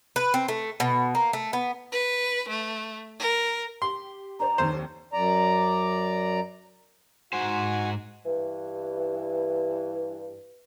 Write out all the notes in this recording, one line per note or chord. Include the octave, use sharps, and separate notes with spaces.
B4
C4
A3
B2
A#3
A3
B3
B4
A3
A#4
G4 C6
D4 C5 D5 A#5
F1 D#2 D#3 C5
F#2 D5 A#5
G#2 F#4 C5 G#5
G2 E3